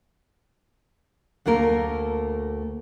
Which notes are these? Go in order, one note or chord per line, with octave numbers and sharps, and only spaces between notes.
D2 A3 A#3 A#4